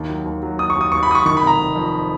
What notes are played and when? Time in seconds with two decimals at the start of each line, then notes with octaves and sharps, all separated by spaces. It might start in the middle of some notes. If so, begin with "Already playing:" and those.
Already playing: D#2 D#3
0.09 F#3
0.26 D#2
0.43 F#3
0.58 D#2 D#6
0.70 C#6
0.75 D#2
0.81 D#6
0.92 D#2 C#6
1.03 B5
1.09 F#3 D#6
1.15 C#6
1.26 D#3 C#6
1.37 B5
1.43 F1 A#5
1.58 F1
1.76 F2